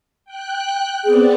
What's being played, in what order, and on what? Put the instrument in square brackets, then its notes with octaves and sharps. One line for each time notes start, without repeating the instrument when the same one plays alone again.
[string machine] G5 F#6
[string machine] B3 C4 D5 [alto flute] G#4